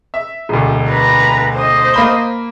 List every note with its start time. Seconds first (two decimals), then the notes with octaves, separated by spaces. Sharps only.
0.14 E5
0.49 E1 D2
0.89 B4 A#5
1.55 C5 D#5
1.94 A#3 B5 G7